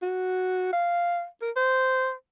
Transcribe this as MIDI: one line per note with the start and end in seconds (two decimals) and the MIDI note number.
0.02 0.69 66
0.73 1.26 77
1.42 1.51 70
1.56 2.13 72